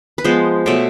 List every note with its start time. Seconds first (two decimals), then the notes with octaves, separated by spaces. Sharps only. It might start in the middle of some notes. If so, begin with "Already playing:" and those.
0.18 B4
0.24 F3 G#3 B3 C5
0.66 B2 F#3 A3